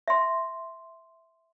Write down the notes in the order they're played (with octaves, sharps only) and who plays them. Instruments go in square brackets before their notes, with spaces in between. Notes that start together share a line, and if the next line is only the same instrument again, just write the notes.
[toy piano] E5 C6